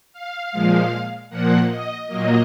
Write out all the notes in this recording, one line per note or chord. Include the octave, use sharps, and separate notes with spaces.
F5
A#2 F3 G#3
A#2 F3 A#3 F#5
D#5
A#2 F#3 A#3 D#5